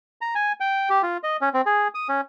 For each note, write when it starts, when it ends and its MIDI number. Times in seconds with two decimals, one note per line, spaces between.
0.21 0.35 82
0.35 0.52 80
0.60 0.89 79
0.90 1.02 67
1.03 1.17 65
1.23 1.37 75
1.41 1.49 61
1.54 1.61 60
1.66 1.88 68
1.95 2.08 87
2.09 2.21 61